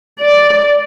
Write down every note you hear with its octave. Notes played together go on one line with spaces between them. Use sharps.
D5